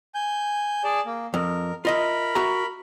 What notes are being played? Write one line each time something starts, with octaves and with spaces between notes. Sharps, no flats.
G#5 G6
G#4 D5 A5
A#3
F2 A#4
F4 A#4 D#5 E5 B5
F#4 E5 A#5